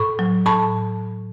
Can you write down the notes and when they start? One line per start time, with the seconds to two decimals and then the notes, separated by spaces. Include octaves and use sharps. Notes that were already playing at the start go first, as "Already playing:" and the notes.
Already playing: A2 B5 C#6
0.19 F#3
0.46 A2 A5 B5